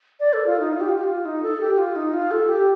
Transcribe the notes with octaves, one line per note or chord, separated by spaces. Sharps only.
D5
A4
F4
D#4
F4
G4
F4
G4
F4
D#4
A4
G4
F4
D#4
F4
A4
G4